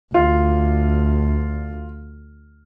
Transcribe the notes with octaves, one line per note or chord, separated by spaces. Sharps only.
D2 F4